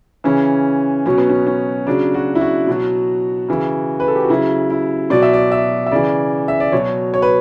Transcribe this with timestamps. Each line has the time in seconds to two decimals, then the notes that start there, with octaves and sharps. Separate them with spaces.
0.24 C#3 E3 C#4
1.06 B2 F#3 C#4
1.18 B3
1.29 C#4
1.47 C#4
1.87 C#3 F#3 D4
2.14 F#4
2.35 E4
2.41 F#4
2.67 B2 F#3
3.49 C#3 E3
4.00 B4
4.08 A4
4.15 G4
4.23 F#4
4.29 C#3 F#3 E4
4.70 E4
5.10 B2 F#3 D5
5.22 E5
5.33 D5
5.52 E5
5.86 E5
5.91 C#3 E3 D5
6.48 E5
6.60 D5
6.72 B2 F#3 C#5
7.14 C#5
7.22 B4